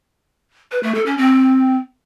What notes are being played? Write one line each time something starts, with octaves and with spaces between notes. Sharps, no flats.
B4
A3
A4
C#4
C4